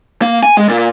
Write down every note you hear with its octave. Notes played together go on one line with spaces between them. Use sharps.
A#3
G#5
G#3
A#2